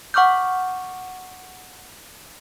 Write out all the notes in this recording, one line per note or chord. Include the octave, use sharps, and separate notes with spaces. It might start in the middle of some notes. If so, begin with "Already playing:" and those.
F#5 C#6 D6 F6 G6